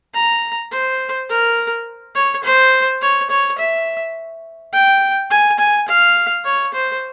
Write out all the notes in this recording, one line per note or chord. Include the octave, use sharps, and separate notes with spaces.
A#5
C5
A#4
C#5
C5
C#5
C#5
E5
G5
G#5
G#5
F5
C#5
C5